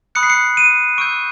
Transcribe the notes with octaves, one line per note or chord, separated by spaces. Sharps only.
B5 D#6 F#6 C#7
C7
C#7
D#7
C#6 E6 G6 D7